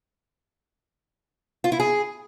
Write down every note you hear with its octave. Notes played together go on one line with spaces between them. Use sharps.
F4
E4
G#4